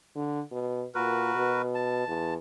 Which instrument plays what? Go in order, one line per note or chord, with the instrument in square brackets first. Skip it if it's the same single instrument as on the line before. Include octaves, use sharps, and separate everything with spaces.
[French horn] D3
B2
[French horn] A#2 [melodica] F#4 A#4 B4
[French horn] B2
[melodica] A5
[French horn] E2